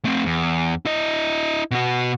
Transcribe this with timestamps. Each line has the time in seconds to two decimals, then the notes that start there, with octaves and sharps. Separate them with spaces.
0.05 A3 C4
0.26 E2
0.85 E4 D#5
1.71 B2 F#4